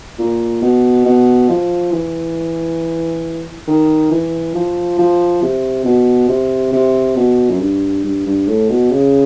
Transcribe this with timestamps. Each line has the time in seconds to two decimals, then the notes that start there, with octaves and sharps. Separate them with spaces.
0.19 A#2
0.62 B2
1.06 B2
1.50 F3
1.93 E3
3.67 D#3
4.11 E3
4.55 F3
4.99 F3
5.42 C3
5.85 B2
6.29 C3
6.73 C3
7.17 B2
7.50 F#2
7.60 G2
8.04 G2
8.26 G2
8.47 A2
8.70 B2
8.92 C#3